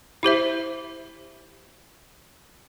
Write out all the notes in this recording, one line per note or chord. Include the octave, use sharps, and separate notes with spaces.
E4 G4 C5 E5